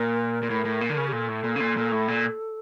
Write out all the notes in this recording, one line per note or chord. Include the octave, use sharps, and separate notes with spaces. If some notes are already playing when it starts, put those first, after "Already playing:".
Already playing: A#2 A#4
A#2
A2
A2
A#2
D3
C#3
G4
A#2 A4
A2
A#2
C#3
A#2
A#2
A2
A#2